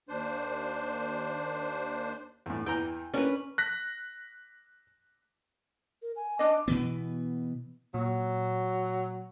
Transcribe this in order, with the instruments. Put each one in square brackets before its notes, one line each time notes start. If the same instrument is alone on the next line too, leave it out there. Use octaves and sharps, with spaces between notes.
[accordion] D#2 D4 C5
[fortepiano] E2 A2
[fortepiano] E2 E3 A#5 [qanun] G5
[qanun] C#4 B4 [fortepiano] D4 A#4
[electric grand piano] F#6 A#6 B6
[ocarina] A#4
G#5
[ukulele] D4 D#5 [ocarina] D6
[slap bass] B2 E3 B3
[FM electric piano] A#2 [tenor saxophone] F#3